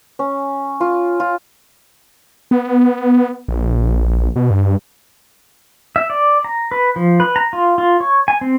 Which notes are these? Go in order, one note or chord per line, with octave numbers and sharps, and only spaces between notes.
C#4
F4
F4
B3
A#1
B2
G2
E5
D5
A#5
B4
F3
B4
A#5
F4
F4
C#5
G#5
C4